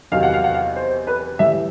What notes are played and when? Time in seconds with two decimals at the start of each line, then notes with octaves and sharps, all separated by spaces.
0.12 E2 C3 D#3 F#3 F5
0.23 F#5
0.34 F5
0.44 F#5
0.54 F5
0.76 C5
1.07 B4
1.39 A2 E3 G3 E5